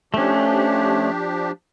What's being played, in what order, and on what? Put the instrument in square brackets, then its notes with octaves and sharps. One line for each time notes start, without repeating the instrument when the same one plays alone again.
[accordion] F3 D4 G4 [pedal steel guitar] A3 C#4